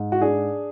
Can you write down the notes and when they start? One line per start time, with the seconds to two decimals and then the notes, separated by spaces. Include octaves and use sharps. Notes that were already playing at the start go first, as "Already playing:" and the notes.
Already playing: G#2
0.12 F#4
0.21 D4 G#4